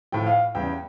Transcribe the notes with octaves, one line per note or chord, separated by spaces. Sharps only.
A2 F3 G5
F5
E2 C#3 G3 G5